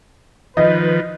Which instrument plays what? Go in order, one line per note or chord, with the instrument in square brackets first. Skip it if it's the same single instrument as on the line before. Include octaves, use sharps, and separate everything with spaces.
[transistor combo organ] D#3 F3 [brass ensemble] B4 [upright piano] D#5